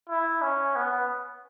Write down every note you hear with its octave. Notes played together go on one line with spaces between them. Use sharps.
E4
C#4
B3